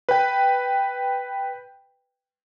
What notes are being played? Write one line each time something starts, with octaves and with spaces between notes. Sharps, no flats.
B4 G5